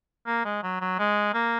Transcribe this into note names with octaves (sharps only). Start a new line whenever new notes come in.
A#3
G#3
F#3
F#3
G#3
A#3